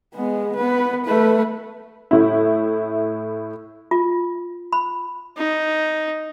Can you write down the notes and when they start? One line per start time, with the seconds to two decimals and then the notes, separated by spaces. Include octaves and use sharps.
0.14 G#3 B3
0.56 B3 B4
1.05 A3 B4
2.11 A2 E4
3.91 F4
4.73 B5
5.37 D#4